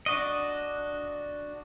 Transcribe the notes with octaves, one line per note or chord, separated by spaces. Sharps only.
D4 F#4 D#5